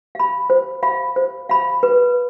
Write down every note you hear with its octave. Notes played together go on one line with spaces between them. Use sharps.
F5 B5
C5
F5 B5
C5
F5 B5
B4